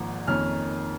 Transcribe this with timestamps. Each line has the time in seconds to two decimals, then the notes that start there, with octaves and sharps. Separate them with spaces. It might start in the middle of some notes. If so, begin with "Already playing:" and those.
Already playing: G#1 G#2 F3 A#3
0.27 F2 D#3 A#3 C#4 F6